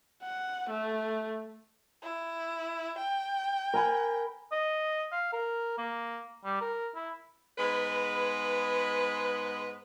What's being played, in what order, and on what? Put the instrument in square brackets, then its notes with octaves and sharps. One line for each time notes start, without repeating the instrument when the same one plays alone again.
[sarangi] F#5
A3
[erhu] E4
G5
[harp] A#4 G#5 B5
[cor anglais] D#5
F5
A#4
A#3
G3
A#4
E4
[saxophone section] G#2 G#3 B3 B4